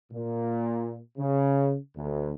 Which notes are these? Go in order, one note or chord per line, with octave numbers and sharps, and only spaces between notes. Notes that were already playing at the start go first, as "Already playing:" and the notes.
A#2
C#3
D2